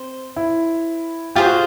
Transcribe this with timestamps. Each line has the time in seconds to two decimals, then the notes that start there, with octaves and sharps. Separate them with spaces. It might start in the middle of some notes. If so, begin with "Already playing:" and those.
Already playing: C4 C5
0.36 E4
1.35 F4 G4 G#4 C5
1.46 F#4